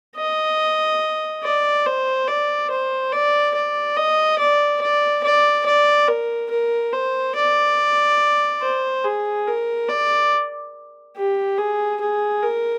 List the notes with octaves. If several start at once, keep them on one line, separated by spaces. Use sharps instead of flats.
D#5
D5
C5
D5
C5
D5
D5
D#5
D5
D5
D5
D5
A#4
A#4
C5
D5
C5
G#4
A#4
D5
G4
G#4
G#4
A#4